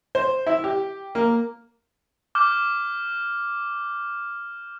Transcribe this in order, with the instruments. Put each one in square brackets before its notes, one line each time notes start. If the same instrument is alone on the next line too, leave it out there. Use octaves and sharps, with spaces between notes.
[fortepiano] C5
E4
G4
A#3
[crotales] D6 F6 G6